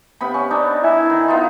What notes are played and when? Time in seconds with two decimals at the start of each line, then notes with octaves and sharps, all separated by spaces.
0.21 C3 B3 B5
0.34 C#4
0.51 D4 D#4
0.84 E4 G#5
1.10 D#3
1.28 B3 D#4 F4